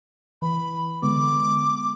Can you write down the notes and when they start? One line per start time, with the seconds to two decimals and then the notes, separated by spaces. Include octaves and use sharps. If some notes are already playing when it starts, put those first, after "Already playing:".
0.42 E3 B5
1.02 D3 G#3 B3 D6